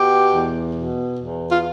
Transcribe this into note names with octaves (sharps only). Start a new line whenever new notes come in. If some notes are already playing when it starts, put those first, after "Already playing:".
Already playing: B2 G4
E2
B2
E2
F4